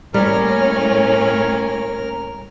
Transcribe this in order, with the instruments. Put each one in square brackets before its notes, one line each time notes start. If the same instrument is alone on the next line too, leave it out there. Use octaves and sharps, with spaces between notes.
[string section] A2 A#3 C#4 [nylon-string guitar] G3 [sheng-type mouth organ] A#4 F6